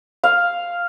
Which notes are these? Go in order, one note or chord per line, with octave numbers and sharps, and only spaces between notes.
F5